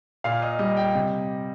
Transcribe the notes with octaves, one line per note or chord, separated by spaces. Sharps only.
A#2 F5
D#5
G3 D#5
G5
C3 D#5